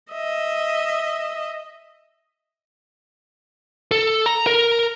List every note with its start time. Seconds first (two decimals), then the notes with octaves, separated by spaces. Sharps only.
0.12 D#5 E5
3.91 A4
4.26 A#5
4.46 A#4